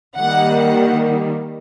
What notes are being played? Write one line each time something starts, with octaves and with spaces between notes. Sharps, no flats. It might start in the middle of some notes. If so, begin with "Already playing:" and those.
D#3 G3 A#3 F#5
F#5